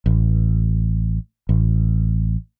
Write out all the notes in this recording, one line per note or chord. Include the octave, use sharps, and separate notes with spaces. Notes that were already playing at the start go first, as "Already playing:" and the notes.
A1
A1